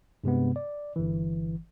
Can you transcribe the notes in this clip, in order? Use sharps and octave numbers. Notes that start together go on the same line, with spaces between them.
G2 C3 G#3 B3
D5
G1 E3